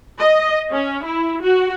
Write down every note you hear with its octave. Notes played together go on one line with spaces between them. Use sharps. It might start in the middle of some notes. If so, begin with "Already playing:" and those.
D#5
C#4
E4
F#4